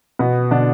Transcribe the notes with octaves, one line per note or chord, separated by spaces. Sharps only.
B2 B3
B2 D3 D4